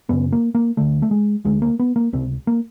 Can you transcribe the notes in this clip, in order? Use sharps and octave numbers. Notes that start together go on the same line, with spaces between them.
F#2 C#3 B3
A#3
A#3
D2 D3 A3
A3
G#3
D2 D3 G#3
A#3
B3
A#3
C#2 C3 C4
A#3